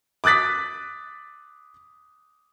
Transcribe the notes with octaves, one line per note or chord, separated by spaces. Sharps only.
D6 D#6 F#6 A6 B6